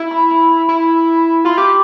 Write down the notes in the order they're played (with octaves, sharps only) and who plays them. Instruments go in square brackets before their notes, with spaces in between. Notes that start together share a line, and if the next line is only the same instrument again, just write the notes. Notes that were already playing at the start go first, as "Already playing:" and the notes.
Already playing: [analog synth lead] E4
[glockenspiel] B5
B5
B5
[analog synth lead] E4
[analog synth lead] F4 [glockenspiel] C6
[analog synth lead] G4 [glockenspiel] D6